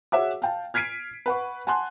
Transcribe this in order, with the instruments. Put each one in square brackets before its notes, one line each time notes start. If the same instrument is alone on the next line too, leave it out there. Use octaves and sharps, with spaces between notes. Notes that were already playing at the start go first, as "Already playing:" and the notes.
[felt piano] F#4 G#4 C#5 E5 F#5 D6
F5 G5 A5
F6 G#6 B6 C7 D7 D#7
B4 F#5 C#6
F#5 G#5 A5 C6 F#6